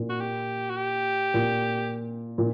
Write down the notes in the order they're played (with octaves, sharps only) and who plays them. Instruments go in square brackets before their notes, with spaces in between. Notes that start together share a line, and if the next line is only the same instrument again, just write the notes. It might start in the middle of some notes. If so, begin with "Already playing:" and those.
Already playing: [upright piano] A#2
[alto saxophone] F#4
G4
F#4
G4
[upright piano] A#2
A#2